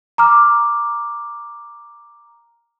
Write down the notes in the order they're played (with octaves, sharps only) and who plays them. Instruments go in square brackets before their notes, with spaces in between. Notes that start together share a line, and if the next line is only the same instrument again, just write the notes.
[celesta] A#5 D6 F6